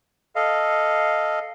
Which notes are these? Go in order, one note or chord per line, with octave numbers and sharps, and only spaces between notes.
A4 D#5 F5